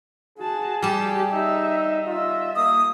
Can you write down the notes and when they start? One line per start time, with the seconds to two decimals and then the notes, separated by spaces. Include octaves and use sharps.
0.38 F#4 G#4 A5
0.82 G3 G4 A5
1.32 D#4 E5
2.07 F4 D#5 E5
2.56 A#3 D#6